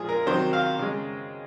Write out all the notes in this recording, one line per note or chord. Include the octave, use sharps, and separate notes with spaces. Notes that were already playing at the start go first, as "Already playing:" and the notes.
Already playing: A#2 F3 G#3 F4 G#4
A#4
C3 D#3 F#3 C5
F5
C#3 G#3